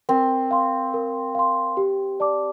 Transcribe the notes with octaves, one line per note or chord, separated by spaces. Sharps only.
C4 A#4
F5 C6
A#4
F5 C6
G4
D5 A5 D6